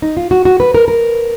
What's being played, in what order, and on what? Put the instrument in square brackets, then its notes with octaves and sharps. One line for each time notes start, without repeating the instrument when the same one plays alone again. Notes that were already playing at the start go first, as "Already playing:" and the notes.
[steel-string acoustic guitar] D#4
F4
F#4
F#4
B4
A#4
A#4